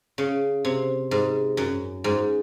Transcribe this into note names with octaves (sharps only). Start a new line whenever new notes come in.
C#3
C3
G#2
F#2
G#2